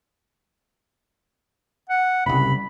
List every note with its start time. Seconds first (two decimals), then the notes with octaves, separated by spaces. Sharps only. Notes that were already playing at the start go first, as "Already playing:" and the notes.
1.90 F#5
2.26 F#1 C2 B5